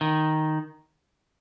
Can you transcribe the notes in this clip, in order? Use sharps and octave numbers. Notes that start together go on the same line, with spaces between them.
D#3